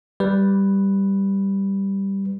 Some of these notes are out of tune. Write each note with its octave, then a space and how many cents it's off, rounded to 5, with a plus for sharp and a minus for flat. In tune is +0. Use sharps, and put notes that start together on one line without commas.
G3 +0 B4 +0